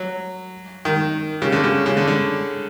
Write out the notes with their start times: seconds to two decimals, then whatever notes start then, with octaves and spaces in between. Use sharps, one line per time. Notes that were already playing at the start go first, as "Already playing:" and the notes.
Already playing: F#3
0.85 D#3
1.42 C#3
1.52 D3
1.64 C#3
1.86 C#3
1.97 D3
2.08 D3